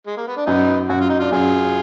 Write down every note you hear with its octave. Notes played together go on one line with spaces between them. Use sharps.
G#3
A#3
B3
D4
F#2 B3 D#4
F#2 F#4
F4
D#4
D4 F4
F#2 F4 G#4